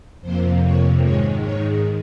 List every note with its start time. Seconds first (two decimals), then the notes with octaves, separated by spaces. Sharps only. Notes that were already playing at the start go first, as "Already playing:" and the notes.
0.21 F2 C3 F3 A#3 C5
0.62 C#5
1.01 G#2 D#3 G#3 C#5
1.41 C#5